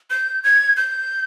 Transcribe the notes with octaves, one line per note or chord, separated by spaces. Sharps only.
G6
G#6
G6